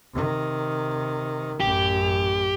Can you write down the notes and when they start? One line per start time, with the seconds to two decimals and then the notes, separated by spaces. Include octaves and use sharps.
0.14 C3 D#3
1.60 A1 F#2 G4